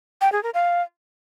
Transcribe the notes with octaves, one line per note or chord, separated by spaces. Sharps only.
G5
G#4
A#4
F5